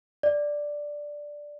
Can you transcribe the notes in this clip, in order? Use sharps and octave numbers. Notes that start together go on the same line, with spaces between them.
D5